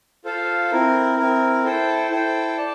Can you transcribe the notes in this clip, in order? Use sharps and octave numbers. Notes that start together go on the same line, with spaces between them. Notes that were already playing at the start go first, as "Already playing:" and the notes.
F4 A4 C5 F5
C4 E4 A#4
C4 E4 A#4
E4 A4 C5 G5
E4 A4 C5 G5
D5 A5